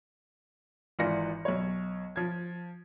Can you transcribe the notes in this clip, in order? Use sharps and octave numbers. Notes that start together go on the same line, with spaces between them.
G#1 E3 F4 D5 A#6 C#7
B1 C#5
F3 G#6